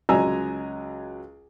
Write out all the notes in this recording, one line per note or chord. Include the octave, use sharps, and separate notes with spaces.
C#2 F#3 D#5 G#5 A#5 E6